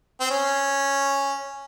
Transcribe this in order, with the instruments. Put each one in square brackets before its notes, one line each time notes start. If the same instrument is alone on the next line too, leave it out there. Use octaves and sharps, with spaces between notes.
[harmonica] C4
C#4